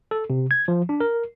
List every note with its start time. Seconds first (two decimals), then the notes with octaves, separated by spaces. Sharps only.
0.11 A4
0.30 C3
0.51 G#6
0.68 F3
0.89 D4
1.00 A#4